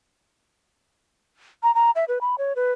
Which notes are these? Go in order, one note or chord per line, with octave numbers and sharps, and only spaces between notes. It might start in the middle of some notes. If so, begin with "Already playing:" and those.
A#5
A#5
E5
B4
B5
C#5
B4